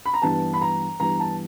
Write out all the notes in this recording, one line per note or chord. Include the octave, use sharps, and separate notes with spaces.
B5
A#5
G2 E3 G3 B3 A5
B5
A#5
G2 E3 G3 B3 A#5
A5